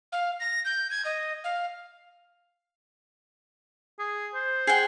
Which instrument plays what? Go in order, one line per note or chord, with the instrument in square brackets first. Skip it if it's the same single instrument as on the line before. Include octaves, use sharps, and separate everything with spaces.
[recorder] F5
A#6
G6
G#6
D#5
F5
[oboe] G#4
C5
[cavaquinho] G#4 F#5 G5